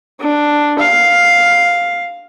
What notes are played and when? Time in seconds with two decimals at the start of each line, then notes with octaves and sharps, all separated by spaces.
0.20 D4
0.79 F5